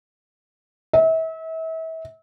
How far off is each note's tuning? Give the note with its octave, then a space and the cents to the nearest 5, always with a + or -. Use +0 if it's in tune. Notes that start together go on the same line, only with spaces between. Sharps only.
E5 -35